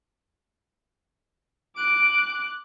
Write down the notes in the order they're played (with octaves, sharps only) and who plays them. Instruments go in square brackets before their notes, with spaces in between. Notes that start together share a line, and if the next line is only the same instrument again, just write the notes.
[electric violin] D6 F#6 [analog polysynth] D7